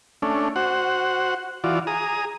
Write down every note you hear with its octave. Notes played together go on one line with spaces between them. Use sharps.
A3 C#4 D4
F#4 C5 F#5
E3 F4 F#4 D5
G#4 A#5 D#6